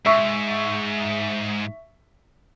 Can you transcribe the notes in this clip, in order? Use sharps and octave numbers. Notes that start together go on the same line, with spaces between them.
G#2 E5 C#6